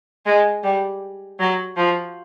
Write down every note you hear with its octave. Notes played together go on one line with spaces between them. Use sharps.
G#3
G3
F#3
F3